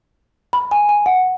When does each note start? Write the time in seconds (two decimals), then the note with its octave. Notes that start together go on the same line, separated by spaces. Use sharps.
0.53 B5
0.71 G#5
0.89 G#5
1.06 F#5